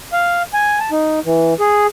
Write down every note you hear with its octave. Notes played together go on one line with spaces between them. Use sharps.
F5
G#5
A5
D#4
E3
G#4